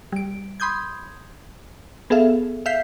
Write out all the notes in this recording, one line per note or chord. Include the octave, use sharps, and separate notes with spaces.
G3 D7
B5 C6 D#6 G6 G#6
B3 G#4 A4 E5 F5
E5 F5 G6 B6 C7